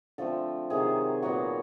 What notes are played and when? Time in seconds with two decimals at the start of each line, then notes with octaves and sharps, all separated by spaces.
0.18 D3 F3 A3 C4 A4
0.70 C3 D#3 F#3 G#4
1.22 A#2 F#3 B3 F#4